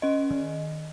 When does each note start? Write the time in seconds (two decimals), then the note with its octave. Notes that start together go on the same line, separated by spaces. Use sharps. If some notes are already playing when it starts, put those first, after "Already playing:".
0.02 C#4 D#5
0.31 D#3